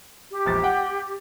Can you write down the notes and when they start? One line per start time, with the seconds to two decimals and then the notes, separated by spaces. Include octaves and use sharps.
0.31 G4
0.46 E1 A#1 A6
0.64 F#5 G5